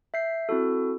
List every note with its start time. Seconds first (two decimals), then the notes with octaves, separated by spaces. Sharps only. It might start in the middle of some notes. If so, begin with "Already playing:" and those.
0.14 E5 G6 C7
0.49 C4 E4 F#4 A4